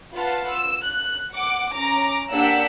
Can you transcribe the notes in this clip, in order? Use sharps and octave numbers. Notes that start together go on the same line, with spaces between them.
F4 B4 F5 F#5 A5
E6
F#6
F#5 D6
C#4 A#5 D6
A#3 D4 G4 F#5 E6 B6